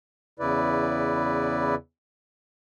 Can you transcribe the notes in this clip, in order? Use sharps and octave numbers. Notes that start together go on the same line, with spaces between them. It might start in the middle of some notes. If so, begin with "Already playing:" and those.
E2 C#3 E4 B4 D5